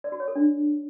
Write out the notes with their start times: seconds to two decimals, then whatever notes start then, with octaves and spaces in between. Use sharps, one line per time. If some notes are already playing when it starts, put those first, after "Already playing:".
0.04 D5
0.12 F#4
0.20 C#5
0.28 A4
0.36 D4